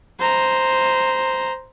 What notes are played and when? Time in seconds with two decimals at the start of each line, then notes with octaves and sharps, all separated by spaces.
0.19 C5 A#5